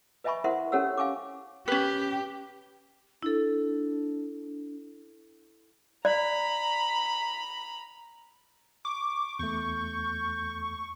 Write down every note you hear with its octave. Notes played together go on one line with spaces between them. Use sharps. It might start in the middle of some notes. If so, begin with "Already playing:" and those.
B4 D#5 E5 G#5 B5 C#6
E4 A#4 C5 E5 F#5 C6
C#4 G4 A4 C#5 F#5 E6
F5 G#5 C#6 D6
C#4 G4 B4
D4 E4 A4
D5 A#5 B5
C#6 D6
E2 A3 C#6 G6